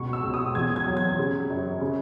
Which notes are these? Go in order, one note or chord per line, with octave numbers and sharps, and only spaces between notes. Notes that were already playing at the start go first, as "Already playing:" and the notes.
Already playing: C#2 B2 C#6
E6
C#2
D#6
E2 G#6
G#6
F#3
G#6
C#3
F#2
C#3